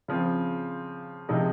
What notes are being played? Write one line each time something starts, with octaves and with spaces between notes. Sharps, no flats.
C#3 F3 C4
C3 F3 G#3 D#4